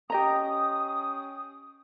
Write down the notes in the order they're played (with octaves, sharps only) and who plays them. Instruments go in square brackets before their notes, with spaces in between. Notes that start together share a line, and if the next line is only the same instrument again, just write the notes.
[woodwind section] C#4 G5 D#6 [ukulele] G4 D#5 A#5